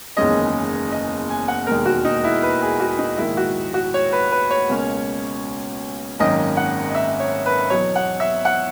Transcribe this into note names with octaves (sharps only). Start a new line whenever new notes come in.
F#1 E2 D#3 G#3 C#4 D#5
D#5
G#5
F#5
E1 D#2 D#3 G#3 A#4
F#4
D#4
E4
B4
G#4
F#4
D#4
A#1 G#2 D#3 A#3 E4
F#4
F#4
C#5
B4
B4
C#5
C#2 B2 A#3 C#4
G#1 F#2 D#3 A#3 C#4 D#5
F#5
D#5
E5
C#5
B4
E2 B2 F#3 C#5
F#5
E5
F#5